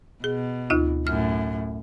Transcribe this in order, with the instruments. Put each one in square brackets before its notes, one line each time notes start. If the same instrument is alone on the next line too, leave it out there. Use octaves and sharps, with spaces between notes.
[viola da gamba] B2 [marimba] G#4
[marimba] D2 D#4 F4
[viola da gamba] F#2 A2 [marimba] F6